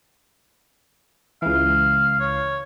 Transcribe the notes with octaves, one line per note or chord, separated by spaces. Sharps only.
C#2 E3 F5
C#5